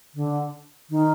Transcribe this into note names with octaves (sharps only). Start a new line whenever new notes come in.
D3
D#3